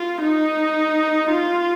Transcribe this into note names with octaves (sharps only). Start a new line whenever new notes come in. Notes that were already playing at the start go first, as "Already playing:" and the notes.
Already playing: F4
D#4
F4